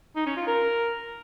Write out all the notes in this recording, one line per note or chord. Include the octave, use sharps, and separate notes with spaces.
D#4
C#4
F4
A#4